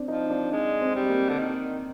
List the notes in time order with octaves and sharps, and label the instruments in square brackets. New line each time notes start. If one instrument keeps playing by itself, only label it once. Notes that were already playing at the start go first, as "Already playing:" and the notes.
Already playing: [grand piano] C4 D4
[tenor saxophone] F3 [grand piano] D#4
[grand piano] D4
[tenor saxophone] G#3 [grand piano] D4
[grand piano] C4
[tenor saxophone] G3
[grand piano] A#3
[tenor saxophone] D3
D#3